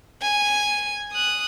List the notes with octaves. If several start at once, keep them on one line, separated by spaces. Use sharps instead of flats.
G#5
D#6 F#6